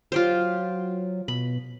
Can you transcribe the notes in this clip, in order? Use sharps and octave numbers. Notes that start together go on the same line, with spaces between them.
F#3 F4 G4 C5
B2 B5